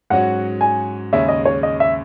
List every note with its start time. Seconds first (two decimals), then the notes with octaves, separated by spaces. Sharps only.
0.10 G#2 F#3 C#4 F#4 F#5
0.61 G#5
1.12 D#2 C#3 G#3 C#4 E5
1.29 D#5
1.45 C#5
1.63 D#5
1.80 E5